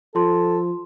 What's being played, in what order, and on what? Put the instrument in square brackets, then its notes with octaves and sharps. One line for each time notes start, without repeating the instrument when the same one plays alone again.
[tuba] F3 [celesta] F4 C6 [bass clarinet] A4